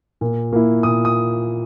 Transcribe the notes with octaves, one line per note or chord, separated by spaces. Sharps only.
A#2
A#3 E4
A#2 D#6
D#6